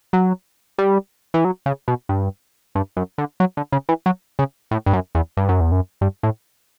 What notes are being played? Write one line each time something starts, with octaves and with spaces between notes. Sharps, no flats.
F#3
G3
E3
F#3
C#3
B2
G2
G2
F#2
D3
F#3
D3
C#3
E3
F#3
C#3
A2
G2
F#2
E2
G2
F#2
E2
F#2
G2
A2